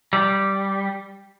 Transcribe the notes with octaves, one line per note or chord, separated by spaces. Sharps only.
G3